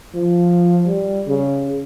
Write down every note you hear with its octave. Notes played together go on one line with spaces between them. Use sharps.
F3
G3
C#3